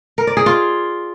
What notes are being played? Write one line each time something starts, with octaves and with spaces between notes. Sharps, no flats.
A#4
D5
G#4
F4